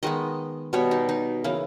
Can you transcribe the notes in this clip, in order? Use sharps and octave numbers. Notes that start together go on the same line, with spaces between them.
D#3 G#3 B3 D#5
B2 G3 B3 C#5
D#4
D#4
C#3 E3 A#3